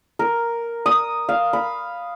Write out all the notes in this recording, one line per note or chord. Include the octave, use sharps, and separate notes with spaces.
A#4
D#6
F5
B5